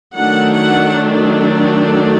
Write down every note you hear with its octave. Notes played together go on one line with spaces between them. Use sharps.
D#3 F#3 A3 D4 F#5
F#5